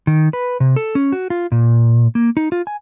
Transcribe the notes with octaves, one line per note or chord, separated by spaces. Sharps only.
D#3
B4
C3
A4
C#4
F#4
F4
A#2
A#3
D#4
F4
G#5